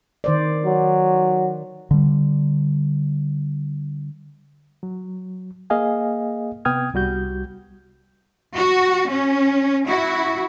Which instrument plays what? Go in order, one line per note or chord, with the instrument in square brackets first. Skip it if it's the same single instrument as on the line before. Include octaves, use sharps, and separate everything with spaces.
[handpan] D#3 C5 D5
[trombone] F#3
[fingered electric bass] D3 G3
[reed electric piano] F#3
A#3 G#4 D#5 F5 G#5
C3 B3 G5 D#6 F6 G#6
C2 G3 F#4 G6
[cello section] F#4
C#4
E4 F#4